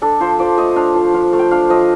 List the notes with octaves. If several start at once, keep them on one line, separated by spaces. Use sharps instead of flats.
D4 A4
F3 C5
F3 D5
A3 D#5
D4 F5
F3
F3 F5
A3
G5
D4 F5
F3 D#5